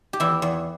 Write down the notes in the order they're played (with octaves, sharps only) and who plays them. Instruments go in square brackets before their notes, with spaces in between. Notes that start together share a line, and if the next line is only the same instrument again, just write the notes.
[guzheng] G4
E2 E3 E4
E2